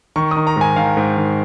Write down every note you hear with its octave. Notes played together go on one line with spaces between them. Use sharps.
D#3 C#6
D#3 D#6
A#5
G#2 G#5
D#3 F5
G#2
D#3